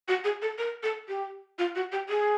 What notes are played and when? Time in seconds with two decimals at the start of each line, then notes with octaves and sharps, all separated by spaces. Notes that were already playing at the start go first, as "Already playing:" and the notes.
0.08 F#4
0.24 G#4
0.42 A4
0.58 A#4
0.83 A4
1.08 G4
1.59 F4
1.75 F#4
1.92 G4
2.09 G#4